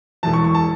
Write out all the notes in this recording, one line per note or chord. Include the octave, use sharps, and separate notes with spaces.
E1 E2 E3 A5
C#6
C#6
A5